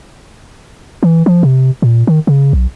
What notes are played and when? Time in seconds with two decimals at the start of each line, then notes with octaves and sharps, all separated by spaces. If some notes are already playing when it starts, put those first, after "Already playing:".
1.03 E3
1.26 F3
1.43 C3
1.82 A#2
2.07 D#3
2.27 C#3
2.53 B1